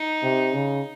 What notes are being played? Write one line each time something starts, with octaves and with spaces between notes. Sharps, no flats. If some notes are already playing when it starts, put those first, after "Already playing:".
Already playing: D#4
C3
C#3